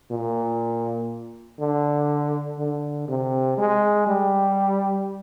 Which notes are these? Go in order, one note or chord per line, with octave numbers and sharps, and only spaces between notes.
A#2
D3
D3
C3
G#3
G3